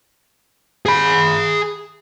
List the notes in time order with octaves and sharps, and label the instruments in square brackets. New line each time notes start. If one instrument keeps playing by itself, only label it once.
[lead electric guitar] G#4 B5